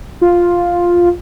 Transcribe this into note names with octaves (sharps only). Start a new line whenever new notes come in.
F4